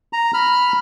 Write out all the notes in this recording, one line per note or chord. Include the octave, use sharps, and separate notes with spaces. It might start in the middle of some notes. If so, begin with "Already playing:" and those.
A#5
B5 F6